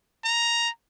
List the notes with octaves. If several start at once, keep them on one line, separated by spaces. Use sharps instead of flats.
A#5